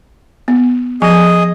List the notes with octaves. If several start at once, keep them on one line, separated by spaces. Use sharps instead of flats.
B3
F3 G#4 D#5 G#5